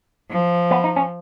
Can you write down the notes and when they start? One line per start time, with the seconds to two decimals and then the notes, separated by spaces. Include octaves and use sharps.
0.31 F3
0.71 B3
0.84 D#4
0.96 C#4